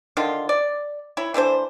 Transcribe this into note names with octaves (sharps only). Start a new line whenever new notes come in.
D3 D#3 F4
D5
E4 C#5
E3 A3 D4 C5